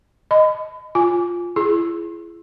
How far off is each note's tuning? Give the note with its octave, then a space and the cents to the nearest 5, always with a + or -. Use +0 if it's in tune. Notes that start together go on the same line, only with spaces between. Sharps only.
D#5 +0 B5 +40
F4 +0 G#5 +0
E4 +40 G#4 +15